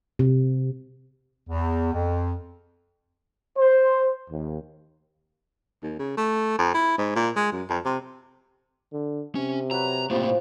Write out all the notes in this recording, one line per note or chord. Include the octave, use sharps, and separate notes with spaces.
C3
E2
F2
C5
D#2
D#2
C#3
A3
F2
E4
G#2
A#2
G#3
F#2
F2
C3
D3
C3 C#4
F#3 B4 A#5
A2 C3 F3 G3 A#3